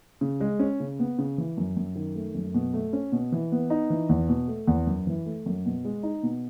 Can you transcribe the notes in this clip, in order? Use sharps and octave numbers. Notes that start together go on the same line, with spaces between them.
C#3
G#3
C#4
C#3
B3
C#3
E3
F#2
F#2
D#3
A3
F#2
B2
A3
C#4
B2
E3
B3
D#4
E3
E2
B2
A3
E2
F#2
E3
A3
F#2
B2
G#3
D#4
B2